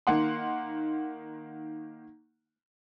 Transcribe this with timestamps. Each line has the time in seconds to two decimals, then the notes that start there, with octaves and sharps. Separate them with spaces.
0.07 D#3 A#3 F#5 C6